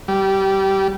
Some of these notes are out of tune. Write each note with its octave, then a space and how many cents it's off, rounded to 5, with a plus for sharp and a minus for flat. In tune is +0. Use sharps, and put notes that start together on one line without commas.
G3 -20